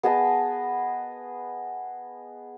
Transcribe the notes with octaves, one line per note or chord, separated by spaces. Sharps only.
B3 G#4 D#5 A5